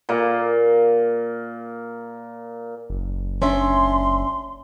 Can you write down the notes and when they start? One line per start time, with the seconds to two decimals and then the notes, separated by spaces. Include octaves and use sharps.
0.09 A#2 A#3
2.90 F#1
3.42 C#4 D4 E5 C6